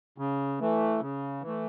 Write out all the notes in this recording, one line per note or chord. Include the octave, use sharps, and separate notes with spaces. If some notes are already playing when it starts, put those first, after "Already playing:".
C#3
E3 A3
C#3
E3
A3